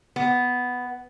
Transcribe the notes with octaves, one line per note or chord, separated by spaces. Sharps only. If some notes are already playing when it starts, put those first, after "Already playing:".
B3